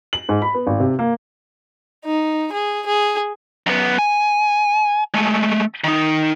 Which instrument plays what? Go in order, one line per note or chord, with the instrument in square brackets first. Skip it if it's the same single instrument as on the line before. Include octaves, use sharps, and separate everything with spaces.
[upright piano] F#7
G#2
B5
B3
G#1
C3
A#3
[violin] D#4
G#4
G#4
[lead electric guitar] F#2 B3
G#5
G#3 A3
D#3 D#4